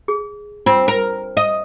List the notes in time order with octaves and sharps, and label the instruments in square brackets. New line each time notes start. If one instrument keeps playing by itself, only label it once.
[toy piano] G#4
[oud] C4 [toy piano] F4
[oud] A#4
D#5